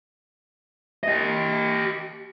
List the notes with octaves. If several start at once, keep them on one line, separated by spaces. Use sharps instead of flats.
G4 D#5